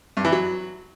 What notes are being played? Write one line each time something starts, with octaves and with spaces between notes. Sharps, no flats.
G2
E3
F#3